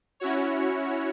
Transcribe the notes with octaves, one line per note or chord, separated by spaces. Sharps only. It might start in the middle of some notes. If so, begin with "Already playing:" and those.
C#4 E4 F#4 C#5